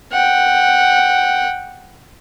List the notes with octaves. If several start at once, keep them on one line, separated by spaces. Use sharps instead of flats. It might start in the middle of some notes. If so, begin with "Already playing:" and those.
F#5 G5